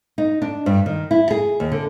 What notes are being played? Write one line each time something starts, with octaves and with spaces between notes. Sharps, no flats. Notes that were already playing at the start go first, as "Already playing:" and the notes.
D#4
D4
G2
D#3
E4
G#4
D#2
D3